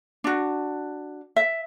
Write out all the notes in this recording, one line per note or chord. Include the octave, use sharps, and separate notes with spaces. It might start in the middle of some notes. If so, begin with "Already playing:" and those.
D4 F#4
E5